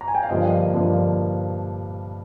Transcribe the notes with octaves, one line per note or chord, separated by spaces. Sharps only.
A#5
G#5
G5
F5
G2 D3 F3 A#3 D#5
G2 D3 F3 A#3